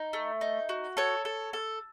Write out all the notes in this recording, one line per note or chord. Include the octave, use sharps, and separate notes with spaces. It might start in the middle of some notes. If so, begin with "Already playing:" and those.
Already playing: D#4
A3
D#4
F#4
A4 C#5
A4
A4